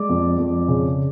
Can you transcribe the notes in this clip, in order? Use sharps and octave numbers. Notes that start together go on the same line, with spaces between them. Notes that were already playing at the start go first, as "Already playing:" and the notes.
Already playing: G#3 D5 D6
F2
F2
C#3